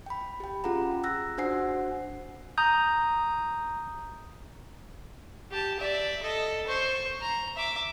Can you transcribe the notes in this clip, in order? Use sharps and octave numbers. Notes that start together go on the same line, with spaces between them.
G5 B5
G4 G5
C#4 F4 G#4 F#5 A#5
E6 F#6 A#6
D4 F#4 C5 F#5 G#5 C7
A#5 D#6 G6
G4 A5
D5 E5
A4 D#5
C5 C#6
A#5
E5 D6